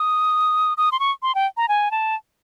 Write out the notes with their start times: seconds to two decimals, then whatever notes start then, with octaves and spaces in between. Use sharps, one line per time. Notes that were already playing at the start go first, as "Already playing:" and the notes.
Already playing: D#6
0.77 D#6
0.92 C6
1.00 C#6
1.22 C6
1.35 G5
1.57 A#5
1.69 G#5
1.91 A5